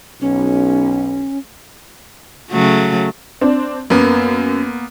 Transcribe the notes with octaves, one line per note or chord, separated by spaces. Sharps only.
B1 C#4
C#3 F#3 A3
C4 D4
F#2 A#3 B3